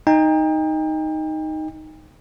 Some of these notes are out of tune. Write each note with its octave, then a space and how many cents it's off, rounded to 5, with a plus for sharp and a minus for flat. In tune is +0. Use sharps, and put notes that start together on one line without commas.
D#4 +0 G5 +35